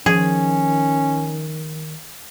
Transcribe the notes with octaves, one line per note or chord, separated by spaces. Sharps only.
D#3 F3 C#4 G#4